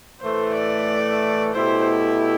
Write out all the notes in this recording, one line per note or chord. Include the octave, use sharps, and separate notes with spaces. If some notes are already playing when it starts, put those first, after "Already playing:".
A2 E3 A3 C5
D5
B2 A3 E4 G4 C5